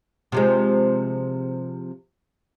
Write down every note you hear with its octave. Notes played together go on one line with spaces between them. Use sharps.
C3 F3 G#3